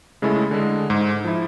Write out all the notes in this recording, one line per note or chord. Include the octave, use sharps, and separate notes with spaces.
C#3 G#3 A3 E4 G#4 A4
D3 G#3
G#2
F3 E4